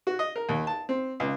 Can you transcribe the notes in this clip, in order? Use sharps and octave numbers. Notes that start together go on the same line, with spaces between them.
F#4
D#5
A#4
D#2
A5
C4
C#2